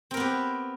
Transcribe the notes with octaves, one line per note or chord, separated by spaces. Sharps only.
B3 C4 G4 A#4